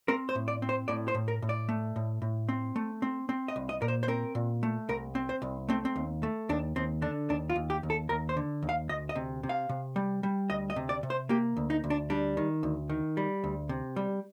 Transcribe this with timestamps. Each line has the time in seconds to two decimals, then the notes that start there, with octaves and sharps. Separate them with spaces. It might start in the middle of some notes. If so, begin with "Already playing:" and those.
0.08 C4 A#4
0.29 C5
0.35 A2
0.48 D5
0.62 C4
0.69 C5
0.88 A2 D5
1.08 C5
1.15 A2
1.28 A#4
1.42 A2
1.49 D5
1.69 A3
1.96 A2
2.22 A2
2.49 C4
2.76 A3
3.02 C4
3.29 C4
3.48 D#5
3.56 C2
3.69 D#5
3.82 A#2 A#4
3.88 C5
4.03 C5
4.08 C4 A#4
4.35 A#2
4.63 A3
4.89 C2 A#4
5.15 C4
5.29 C5
5.42 C2
5.69 A3 C4
5.85 C4
5.96 D#2
6.23 A3
6.49 D#2 D4
6.76 D#2 C4
7.02 D3 D4
7.30 D#2 D4
7.50 F4
7.55 D#2
7.70 G4
7.83 D#2
7.90 A4
8.09 D#2 A#4
8.29 C5
8.37 D3
8.62 D#2
8.69 F5
8.89 D2 D#5
9.09 D#5
9.15 C3
9.43 C3
9.49 F5
9.69 C3
9.96 G3
10.23 G3
10.50 D2 D#5
10.70 D#5
10.76 C3
10.89 D5
11.03 C3
11.10 C5
11.29 A#3 G4
11.57 D2
11.70 D#4
11.84 D2
11.90 D4
12.10 G3 D4
12.37 D#3
12.63 D2
12.90 D#3
13.17 G3
13.44 D2
13.69 C3
13.96 G3